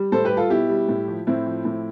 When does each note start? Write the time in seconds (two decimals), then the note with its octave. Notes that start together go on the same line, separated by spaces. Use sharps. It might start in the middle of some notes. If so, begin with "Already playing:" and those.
Already playing: G3
0.12 A2 A4 C5
0.25 G4 B4
0.31 G3
0.37 F4 A4
0.50 B2 E4 G4
0.69 G3
0.89 A2
1.08 F3
1.27 A2 C4 E4
1.46 F3
1.65 A2